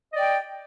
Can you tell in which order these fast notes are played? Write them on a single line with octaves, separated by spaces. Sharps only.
D#5 D5 G5